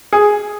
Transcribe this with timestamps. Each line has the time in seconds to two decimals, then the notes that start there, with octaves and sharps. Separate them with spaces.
0.13 G#4